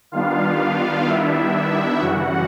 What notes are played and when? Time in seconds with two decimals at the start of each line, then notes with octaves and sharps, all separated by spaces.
0.11 D#3 G3 B3 D4 F4 F5
1.05 E4 E5
1.98 F#2 C#3 E3 G3 F#4 F#5